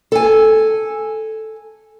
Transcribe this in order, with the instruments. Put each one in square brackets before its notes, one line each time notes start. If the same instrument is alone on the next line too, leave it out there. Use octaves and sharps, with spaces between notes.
[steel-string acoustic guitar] A4 G#5